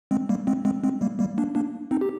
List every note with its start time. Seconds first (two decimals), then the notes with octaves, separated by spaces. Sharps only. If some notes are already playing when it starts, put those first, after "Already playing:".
0.11 G#3 C4
0.29 G3 A#3
0.47 G#3 C4
0.65 G#3 C4
0.84 G#3 C4
1.01 G3 A#3
1.19 G3 A#3
1.38 A#3 D4
1.55 A#3 D4
1.91 C4 D#4
2.01 G4